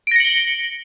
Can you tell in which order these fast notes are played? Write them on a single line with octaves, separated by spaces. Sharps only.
D7 A#6 C#7 F#7 G7